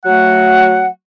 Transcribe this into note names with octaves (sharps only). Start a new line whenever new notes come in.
F#3 A3 F#5